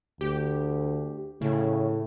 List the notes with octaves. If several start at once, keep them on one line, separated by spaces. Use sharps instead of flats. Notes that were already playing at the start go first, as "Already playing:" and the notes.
D2 G4
A2 C#3